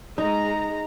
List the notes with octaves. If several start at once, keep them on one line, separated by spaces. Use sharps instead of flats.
G#3 D#4 A#5